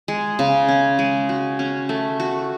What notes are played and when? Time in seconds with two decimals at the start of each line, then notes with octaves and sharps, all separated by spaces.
0.08 G#3
0.39 C#3
0.68 C#4
0.99 G#3
1.29 F#4
1.59 C#4
1.89 A3
2.20 F#4